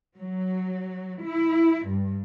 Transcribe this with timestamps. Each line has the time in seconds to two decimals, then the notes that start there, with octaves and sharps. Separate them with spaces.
0.16 F#3
1.24 E4
1.88 G2